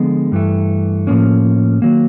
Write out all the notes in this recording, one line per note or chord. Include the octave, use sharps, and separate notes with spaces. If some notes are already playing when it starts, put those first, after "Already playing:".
Already playing: D3 F3 G#3 B3
G2 E3 A3
A2 F3 A#3 C#4
D#3 F#3 A#3